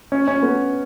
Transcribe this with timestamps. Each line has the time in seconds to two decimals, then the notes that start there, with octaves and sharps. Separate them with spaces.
0.12 C#4
0.28 C#4
0.42 B3